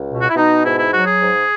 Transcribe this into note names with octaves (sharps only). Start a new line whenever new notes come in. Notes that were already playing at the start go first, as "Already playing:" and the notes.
Already playing: C#2
B2
F#4
E4
B2 D#4
G#2 E4
E4
F#3 F#4
G#4
G#2